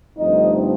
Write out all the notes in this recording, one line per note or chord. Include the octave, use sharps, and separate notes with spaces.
G2 D3 F3 A3 C4 D#4 D#5